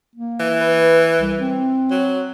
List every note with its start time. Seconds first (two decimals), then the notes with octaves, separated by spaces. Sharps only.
0.16 A#3
0.40 E3
0.60 B4
1.21 C2
1.39 C4
1.91 F#3